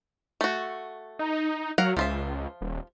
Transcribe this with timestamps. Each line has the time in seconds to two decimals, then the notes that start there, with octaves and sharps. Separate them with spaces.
0.41 A3 F#4
1.19 D#4
1.78 F#3 A#4 F5 F#5
1.97 C#2 F3 F4 E5
2.61 D#1